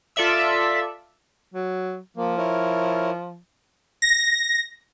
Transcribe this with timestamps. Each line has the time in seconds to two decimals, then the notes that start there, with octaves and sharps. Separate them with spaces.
0.16 F4 A4 D5 E5 E6
1.54 F#3
2.17 F3 A#3
2.38 E4 A#4 C#5
4.02 A#6